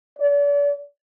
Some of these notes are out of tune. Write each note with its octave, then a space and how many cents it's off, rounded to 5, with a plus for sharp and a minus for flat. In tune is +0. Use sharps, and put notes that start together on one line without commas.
D5 -40